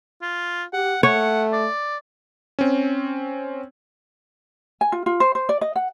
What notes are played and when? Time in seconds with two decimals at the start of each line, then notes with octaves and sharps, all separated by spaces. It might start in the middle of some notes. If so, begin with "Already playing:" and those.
0.22 F4
0.73 G4 F#5
1.03 A3 C#5 F#5
1.53 D5
2.59 C4 C#4
4.81 G#5
4.92 F4
5.06 F4
5.20 C5
5.35 C5
5.49 D5
5.61 D#5
5.76 F#5